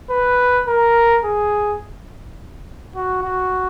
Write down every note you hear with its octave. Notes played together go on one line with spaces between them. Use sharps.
B4
A#4
G#4
F#4
F#4